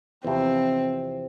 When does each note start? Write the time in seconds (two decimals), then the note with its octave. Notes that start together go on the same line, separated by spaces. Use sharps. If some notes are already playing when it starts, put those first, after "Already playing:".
0.24 E2 C3 F3 C4